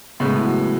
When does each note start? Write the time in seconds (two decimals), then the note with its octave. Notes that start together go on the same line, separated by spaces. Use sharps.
0.20 A2 C#3 G#3 B3
0.33 E3
0.45 F#3